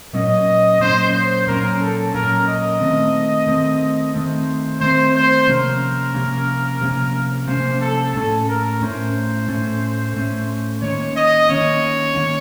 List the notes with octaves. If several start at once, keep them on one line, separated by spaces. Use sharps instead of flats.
A#2 F#3 A#3 C#4 D#5
A#2 F#3 A#3 C#4 C5
C5
A#2 F#3 A#3 C#4 A#4
A4
A#2 F#3 A#3 C#4 A#4
D#5
D#3 A3 C4
D#3 A3 C4
D#3 A3 C4 C5
D#3 A3 C4 C5
C5
C3 F3 A#3 C#4 A#4
C3 F3 A#3 C#4
C3 F3 A#3 C#4
C3 F3 A#3 C#4 C5
A4
A2 A3 C#4 A4
A#4
A2 A3 C#4 C5
A2 A3 C#4
A2 A3 C#4
D#3 A#3 C#4 C#5
D#5
D#3 A#3 C#4 C#5
D#3 A#3 C#4